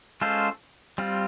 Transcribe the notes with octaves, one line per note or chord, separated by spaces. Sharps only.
G#3 C#4 F4 A4 C5
G3 C4 F4